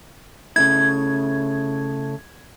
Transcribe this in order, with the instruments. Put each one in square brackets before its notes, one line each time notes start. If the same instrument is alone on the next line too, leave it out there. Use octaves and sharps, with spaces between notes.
[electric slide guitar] C#3 A3 E4 [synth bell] G#6